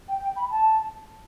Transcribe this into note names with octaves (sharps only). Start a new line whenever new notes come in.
G5
G5
B5
A5